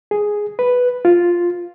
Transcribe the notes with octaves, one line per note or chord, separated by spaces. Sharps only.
G#4
B4
F4